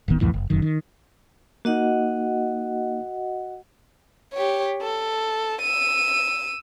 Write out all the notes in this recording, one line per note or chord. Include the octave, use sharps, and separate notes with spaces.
D1 A1 D#3 B3
C2 F2 A2 E3
F#1
F1 F#2 D#3
D#3
A#3 D#4 F#4 D#5 F#5
G4 C#5
A4
E6 D#7